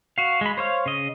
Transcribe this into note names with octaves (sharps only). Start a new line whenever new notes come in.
F#4 F5
G#3 B5
C5 C#5 F5
C#3 D#5